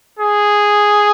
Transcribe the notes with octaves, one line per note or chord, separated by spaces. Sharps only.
G#4